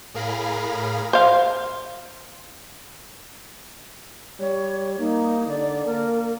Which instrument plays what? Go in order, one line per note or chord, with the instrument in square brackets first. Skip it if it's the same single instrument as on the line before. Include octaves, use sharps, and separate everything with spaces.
[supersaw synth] A2 G#4 A#4 F5 B5 A#6
[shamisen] C5 F5
[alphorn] G3 [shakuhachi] C#5
[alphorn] A#3 [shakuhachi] D#4
[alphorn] D3 [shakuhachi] D5
[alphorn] A#3 [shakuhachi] A#4